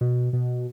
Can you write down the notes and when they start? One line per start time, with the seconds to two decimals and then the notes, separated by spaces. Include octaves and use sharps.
0.01 B2
0.33 B2